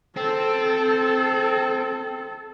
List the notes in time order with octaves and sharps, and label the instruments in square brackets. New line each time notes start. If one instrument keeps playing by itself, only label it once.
[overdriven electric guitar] C4 [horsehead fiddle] A4